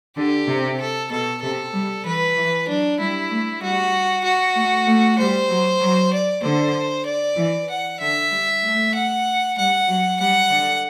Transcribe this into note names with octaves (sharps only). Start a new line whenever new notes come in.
D3 G4
C3
A4
B2 A4
C3 A4
G3
E3 B4
E3
F#3 D4
G3 E4
A3
G3 F#4
F#4
A3
A3
G3 C5
F#3
F#3
D5
D3 C5
D5
E3
F#5
D3 E5
G3
A3
F#5
G3 F#5
F#3
G3 F#5
D3